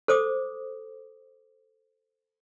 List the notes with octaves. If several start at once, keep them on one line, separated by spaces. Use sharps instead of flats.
A4 C5 D6 D#6